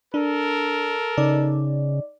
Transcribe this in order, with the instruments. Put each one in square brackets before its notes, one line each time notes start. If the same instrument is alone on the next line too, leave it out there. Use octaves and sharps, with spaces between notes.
[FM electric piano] D4 [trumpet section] A4 A#4
[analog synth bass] C#3 [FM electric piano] D#4 D5